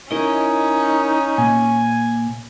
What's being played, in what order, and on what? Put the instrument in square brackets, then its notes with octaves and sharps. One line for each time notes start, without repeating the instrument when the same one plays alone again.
[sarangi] C#4 [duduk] D#4 [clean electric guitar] E4 A#4 D#5
[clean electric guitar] A#2 [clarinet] G#5